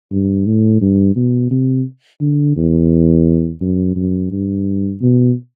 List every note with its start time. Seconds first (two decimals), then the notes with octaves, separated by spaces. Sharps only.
0.12 G2
0.46 A2
0.81 G2
1.16 B2
1.51 C3
2.21 D3
2.57 E2
3.61 F#2
3.96 F#2
4.32 G2
5.01 B2